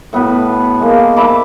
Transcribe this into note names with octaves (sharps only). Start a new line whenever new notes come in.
A2 B3 F#4 B4
G#3 A#3
C5 E5 B5 D6